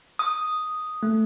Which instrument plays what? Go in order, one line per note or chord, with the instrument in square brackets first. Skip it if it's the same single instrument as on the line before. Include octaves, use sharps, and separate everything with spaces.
[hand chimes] D#6
[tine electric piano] A3